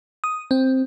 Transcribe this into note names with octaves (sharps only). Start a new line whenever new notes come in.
D#6
C4